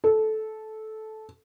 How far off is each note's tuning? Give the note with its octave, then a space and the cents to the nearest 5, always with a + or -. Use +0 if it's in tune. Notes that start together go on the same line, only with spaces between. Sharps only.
A4 -15